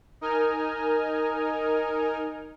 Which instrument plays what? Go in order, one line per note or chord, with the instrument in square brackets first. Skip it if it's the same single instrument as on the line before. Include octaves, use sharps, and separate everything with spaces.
[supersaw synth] D#4 A#4 D#5 G#5 F6